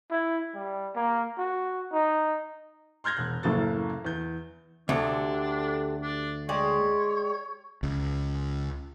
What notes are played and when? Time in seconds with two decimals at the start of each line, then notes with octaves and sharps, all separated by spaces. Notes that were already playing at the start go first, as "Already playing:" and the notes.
0.11 E4
0.55 G3
0.96 A#3
1.38 F#4
1.92 D#4
3.04 C6 F6 G6 G#6 A#6
3.17 E1 F#6
3.43 F#1 A2 C#3 A#3 A4 A6
4.05 E2 G6
4.89 D2 C3 D4 G4 A4
6.03 D4
6.49 G#3 G4 C#5 D5
7.83 C#2